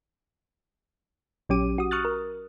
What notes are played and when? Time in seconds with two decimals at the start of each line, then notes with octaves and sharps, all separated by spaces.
1.49 A#1 F#3 C#4 G4 D6 D#7
1.78 F#4 D#6
1.91 C#6 D#6 F6 F#6 A6
2.05 A#4